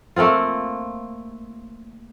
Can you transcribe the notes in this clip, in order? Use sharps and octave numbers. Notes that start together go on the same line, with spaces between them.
A3 A#3 C4 F4